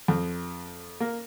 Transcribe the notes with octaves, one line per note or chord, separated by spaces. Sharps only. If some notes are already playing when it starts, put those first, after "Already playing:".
F2
A#3